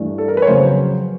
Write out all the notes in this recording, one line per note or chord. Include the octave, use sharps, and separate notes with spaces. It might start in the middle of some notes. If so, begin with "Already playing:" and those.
Already playing: G2 E3 A3 D4
A4
A#4
B4
C#5
F2 C#3 F#3 C5